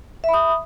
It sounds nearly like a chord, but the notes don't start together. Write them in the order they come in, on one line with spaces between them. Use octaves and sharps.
E5 B5 D#6